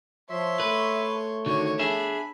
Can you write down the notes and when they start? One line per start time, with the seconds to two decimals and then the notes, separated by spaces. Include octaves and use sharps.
0.30 F3 C#5 E5 C6
0.60 A3 B4
1.46 D3 D#3 F#4 C#5
1.79 D4 G#4 E5 B5